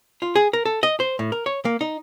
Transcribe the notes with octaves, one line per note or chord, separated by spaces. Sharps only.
F4
G#4
A#4
A4
D#5
C5
A2
A#4
C#5
A#3
D#4